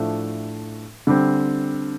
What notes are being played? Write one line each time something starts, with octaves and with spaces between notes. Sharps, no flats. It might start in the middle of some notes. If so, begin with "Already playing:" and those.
Already playing: A2 F3 A3 D4
D3 G3 C4